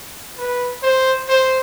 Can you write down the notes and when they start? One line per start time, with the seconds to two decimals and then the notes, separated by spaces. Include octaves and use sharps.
0.38 B4
0.83 C5
1.28 C5